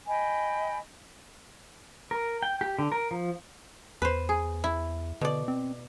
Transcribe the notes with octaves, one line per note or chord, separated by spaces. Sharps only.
D#5 G5 G#5 B5
A#4
G5
G4
D3
A#4
F3
E2 B4 C5
G#4
E4
B2 D3 D5
C4